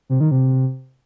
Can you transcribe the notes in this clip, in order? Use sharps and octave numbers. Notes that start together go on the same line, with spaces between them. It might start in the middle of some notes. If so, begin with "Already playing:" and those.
C3
D#3
C3